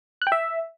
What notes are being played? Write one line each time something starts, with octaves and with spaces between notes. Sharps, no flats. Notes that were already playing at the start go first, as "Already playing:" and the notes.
F#6
G5
E5